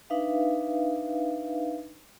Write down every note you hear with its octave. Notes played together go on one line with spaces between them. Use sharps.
D4 D#4 B4 E5 F5